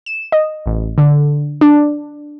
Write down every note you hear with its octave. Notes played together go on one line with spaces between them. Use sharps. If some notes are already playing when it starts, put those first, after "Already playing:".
E7
D#5
A1
D3
D4